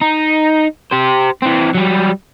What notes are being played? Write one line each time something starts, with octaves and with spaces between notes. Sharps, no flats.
D#4
G4 C5
E3 C4
F#3 G3